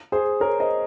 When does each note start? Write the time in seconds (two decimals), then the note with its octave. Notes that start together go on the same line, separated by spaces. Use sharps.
0.12 G#4 C5
0.40 A#4 C#5
0.60 C5 D#5